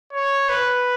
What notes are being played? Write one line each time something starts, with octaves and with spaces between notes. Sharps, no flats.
C#5
B4